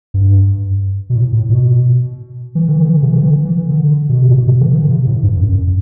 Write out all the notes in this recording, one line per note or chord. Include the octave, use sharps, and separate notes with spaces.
G2
B2
A2
A2
B2
E3
D3
E3
D3
C3
E3
D3
E3
D3
B2
C3
A2
B2
C3
E3
D3
C3
A2
G2
F#2
F#2